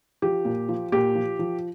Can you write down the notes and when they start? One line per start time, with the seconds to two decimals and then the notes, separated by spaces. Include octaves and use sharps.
0.22 F3 G4
0.45 A#2
0.68 F3
0.92 A#2 G4
1.15 F3
1.39 F3